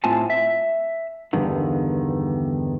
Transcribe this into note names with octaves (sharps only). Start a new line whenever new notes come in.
A2 C4 F4 G#5 A5
E5
E2 G2 D3 D#3